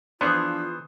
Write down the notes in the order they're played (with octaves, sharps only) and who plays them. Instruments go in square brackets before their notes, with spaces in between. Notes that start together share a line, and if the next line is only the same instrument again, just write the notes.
[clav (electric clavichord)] E3 B3 G#4 [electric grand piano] F3 D4 D#6 [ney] F4 [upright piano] C5